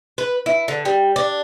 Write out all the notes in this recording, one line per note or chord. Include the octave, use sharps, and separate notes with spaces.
B4
E4
D3
G3
D4